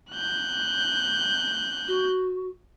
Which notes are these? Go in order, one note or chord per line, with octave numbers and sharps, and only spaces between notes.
F#6 G6
F#4